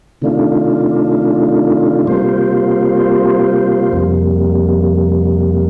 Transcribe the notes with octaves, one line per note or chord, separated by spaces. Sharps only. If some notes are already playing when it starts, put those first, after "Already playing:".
C3 D#3 A3 D4 F4
C3 G3 A#3 F4 C5
F2 C3 G3 A#3